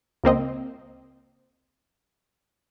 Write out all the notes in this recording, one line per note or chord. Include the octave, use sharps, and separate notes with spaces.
C#2 A#3 C4 D#5